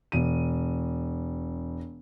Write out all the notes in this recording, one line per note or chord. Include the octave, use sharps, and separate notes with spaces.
E1 D#7